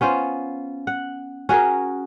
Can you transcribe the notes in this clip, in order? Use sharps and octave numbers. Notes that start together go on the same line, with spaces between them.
B3 C#4 F4 C5
F#5
C#4 F#4 G#4 A#4